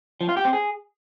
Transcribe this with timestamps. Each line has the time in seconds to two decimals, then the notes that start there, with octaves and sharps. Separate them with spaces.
0.21 F3
0.29 F4
0.37 G4
0.45 C4
0.53 G#4